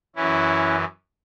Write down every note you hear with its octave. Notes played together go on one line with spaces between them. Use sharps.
F#2 E3 C#4 E4